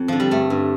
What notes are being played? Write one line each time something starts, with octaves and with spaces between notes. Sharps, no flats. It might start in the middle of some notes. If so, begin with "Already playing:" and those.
Already playing: F2 C4
D3 F3
G3
G2 A3
G2